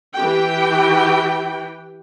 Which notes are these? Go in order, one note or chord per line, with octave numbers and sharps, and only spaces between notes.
E3 G4 G5